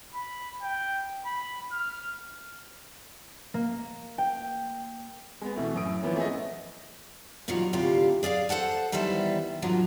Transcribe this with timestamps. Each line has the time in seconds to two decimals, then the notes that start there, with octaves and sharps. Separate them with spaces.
0.15 B5
0.63 G5
1.25 B5
1.72 F6
3.54 A#3
4.18 G5
5.42 G#3 B3
5.56 B2 E3 A3
5.74 F#2 A2 D#6 D7
6.02 E3 F3 A#3 B3 C#4
6.16 A3 B3 G#4 A4 D#5
7.48 G2 A#2 D#3 F3 F#3
7.73 D2 A2 C3 F4 G4
8.23 G#4 D5 E5 F5
8.49 A4 C5 F#5 A5
8.92 D#3 E3 G3 B3 C5 E5
9.62 G#2 D3 F3 F#3